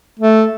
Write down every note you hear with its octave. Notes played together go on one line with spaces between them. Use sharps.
A3